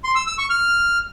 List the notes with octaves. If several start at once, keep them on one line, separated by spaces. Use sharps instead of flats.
C6
E6
E6
C#6
F6